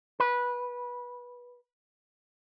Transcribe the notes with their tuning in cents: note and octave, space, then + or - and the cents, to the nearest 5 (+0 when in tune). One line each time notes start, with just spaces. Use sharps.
B4 -15